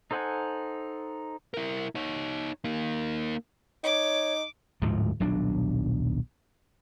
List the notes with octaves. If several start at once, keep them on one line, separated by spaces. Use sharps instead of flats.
D#4 A4 C5 F#5 G#5
E4 A#4
D#4 C#5
A#3 D#4
D#4 C#5 D6
D1 D2 G#2 F3
D#1 B1 F#3 D4